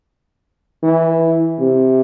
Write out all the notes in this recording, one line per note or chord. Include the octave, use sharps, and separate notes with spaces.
E3
C3